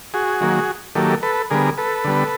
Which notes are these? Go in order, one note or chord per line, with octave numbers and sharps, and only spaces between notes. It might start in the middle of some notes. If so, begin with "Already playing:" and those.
F#4 G#4
D#3 F#3 A#3
D#3 F#3 A#3 G4 A4
A4 B4
D3 G3 B3 G#4 A#4
A4 B4
D3 G3 B3